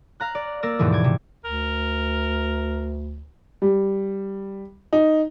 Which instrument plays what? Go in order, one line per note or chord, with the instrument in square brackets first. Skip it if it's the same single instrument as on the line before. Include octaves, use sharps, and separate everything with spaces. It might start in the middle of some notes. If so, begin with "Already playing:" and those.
[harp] F5 A#5 F#6
D5
A#3 A#4 D5 E6 A#6
D#2 G#2 B2 E3 F3
D6 G#6
C3
[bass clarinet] D2 [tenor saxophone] A#4
[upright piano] G3
D#4